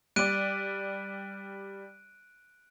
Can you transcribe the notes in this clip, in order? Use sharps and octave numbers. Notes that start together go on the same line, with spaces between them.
G3 D5 F#6 D7 D#7